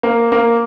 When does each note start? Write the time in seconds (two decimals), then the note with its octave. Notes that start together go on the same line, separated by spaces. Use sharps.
0.03 A#3
0.32 A#3